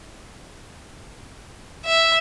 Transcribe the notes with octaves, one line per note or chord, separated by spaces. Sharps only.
E5